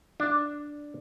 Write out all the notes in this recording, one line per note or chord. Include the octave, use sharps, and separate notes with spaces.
D4